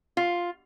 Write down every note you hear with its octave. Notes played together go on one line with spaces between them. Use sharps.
F4